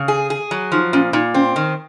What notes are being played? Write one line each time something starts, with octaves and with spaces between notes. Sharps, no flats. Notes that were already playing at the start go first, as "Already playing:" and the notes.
Already playing: C#3
G#4
G#4
F#3
F3 D#4
A#2 C#4
A#2 D#4
C4 C#4
D#3